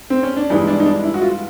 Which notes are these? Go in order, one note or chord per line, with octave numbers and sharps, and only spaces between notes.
C4
C#4
D4
G2 E3 G#3 D#4
D4
D#4
D4
E4
F#4
F4